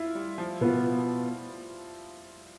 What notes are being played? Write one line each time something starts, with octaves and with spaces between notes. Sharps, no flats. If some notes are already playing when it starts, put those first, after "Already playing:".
Already playing: E4 F4
G3
F3
B2 B3 F4